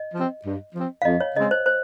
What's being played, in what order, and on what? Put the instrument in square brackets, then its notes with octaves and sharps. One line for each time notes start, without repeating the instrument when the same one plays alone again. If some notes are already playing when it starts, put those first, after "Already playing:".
Already playing: [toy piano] D#5
[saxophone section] F3 C4
G2
F3 C4
[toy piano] F5
[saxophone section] F2 [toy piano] D#5
[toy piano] C#5
[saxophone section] C#3 G#3 C4 [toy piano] D#5
[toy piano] C5
C5